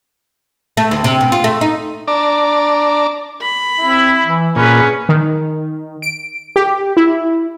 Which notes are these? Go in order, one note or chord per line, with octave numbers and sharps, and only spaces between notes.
A3
D2
C3
B2
F4
A3
D#4
D4 D5 A5 A#5 D6
B5
C4 E4
E3
A#2 C#4 G#4 B4
D#3
D7
G4
E4